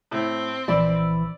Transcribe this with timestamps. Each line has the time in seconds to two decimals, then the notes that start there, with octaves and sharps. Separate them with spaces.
0.11 A2 C4
0.68 A#1 E3 D5 B5 E6